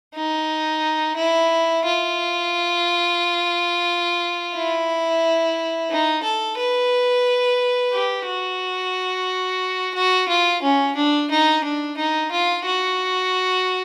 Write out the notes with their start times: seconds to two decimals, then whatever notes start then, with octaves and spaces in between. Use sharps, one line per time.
0.15 D#4
1.17 E4
1.85 F4
4.55 E4
5.90 D#4
6.23 A4
6.58 B4
7.93 G4
8.27 F#4
9.95 F#4
10.28 F4
10.62 C#4
10.96 D4
11.31 D#4
11.64 D4
11.97 D#4
12.32 F4
12.66 F#4